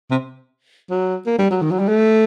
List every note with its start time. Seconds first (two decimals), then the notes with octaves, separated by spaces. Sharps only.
0.11 C3
0.90 F#3
1.26 A#3
1.39 G3
1.51 F#3
1.62 D#3
1.71 F#3
1.79 G3
1.88 A3